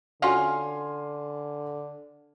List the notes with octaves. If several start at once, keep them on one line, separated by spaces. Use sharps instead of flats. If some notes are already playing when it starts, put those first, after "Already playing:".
D3 C#4 F4 F#4 G#5 C6 F6